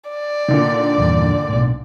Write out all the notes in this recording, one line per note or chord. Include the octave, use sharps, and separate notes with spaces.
D5
A#2 D3 D#3
A#1 E2 G2
B1 A2